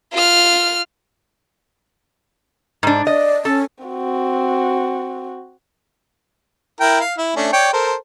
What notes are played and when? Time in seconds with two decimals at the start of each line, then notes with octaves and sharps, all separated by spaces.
0.13 F4 F6
2.83 G#2 D4
3.07 D5 D#5
3.45 C#4 A4
3.84 C4 F#4
6.81 E4 A#4 G5
7.01 F5
7.18 E4
7.36 A3 C#4 D4
7.53 C#5 D5 G5
7.73 A4 A#4 C5